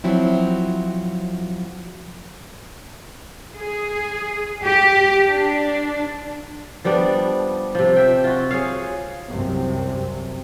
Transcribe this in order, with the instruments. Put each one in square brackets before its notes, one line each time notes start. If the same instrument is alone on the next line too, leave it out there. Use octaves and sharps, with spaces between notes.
[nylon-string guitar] F3 F#3 C4 E4
[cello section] G#4
G4
D4
[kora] F3 G3 B3 D4
C3 F3
E5 G5
F4 F#4
G#4 C#5 F5
[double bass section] C2 F#2 C3